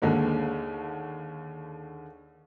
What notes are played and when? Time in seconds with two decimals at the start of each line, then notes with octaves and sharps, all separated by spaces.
0.02 D#2 D3 G#3 A#3